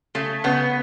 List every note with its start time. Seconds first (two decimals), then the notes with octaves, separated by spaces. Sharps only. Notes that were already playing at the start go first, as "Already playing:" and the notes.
0.15 C#3 A3
0.44 C#3 B3